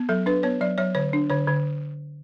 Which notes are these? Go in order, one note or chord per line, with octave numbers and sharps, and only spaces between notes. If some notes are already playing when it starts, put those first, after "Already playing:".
Already playing: B3
F#3 A4
D4 B4
B3 C#5
F#3 D5
F#3 C#5
D3 C#5
D4
D3 C#5
D3